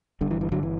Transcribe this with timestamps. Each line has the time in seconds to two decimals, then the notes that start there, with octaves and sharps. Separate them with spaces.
0.21 G1 G2 D3
0.31 E3
0.41 E3
0.52 D3 F#3
0.63 E3